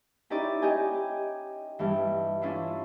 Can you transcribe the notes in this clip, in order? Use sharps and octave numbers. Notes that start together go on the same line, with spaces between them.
C#4 D#4 E4 G4 D5
G4 D#5 G5 G#5
G2 E3
C#4 D4 E4 F4